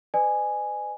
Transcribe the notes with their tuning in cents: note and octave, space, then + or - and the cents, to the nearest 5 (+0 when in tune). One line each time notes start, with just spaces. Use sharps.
B4 +35 D5 +45 G#5 +0